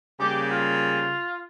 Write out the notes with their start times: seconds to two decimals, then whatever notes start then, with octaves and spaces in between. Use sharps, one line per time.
0.20 C#3 G3 A#3 G4
0.50 F4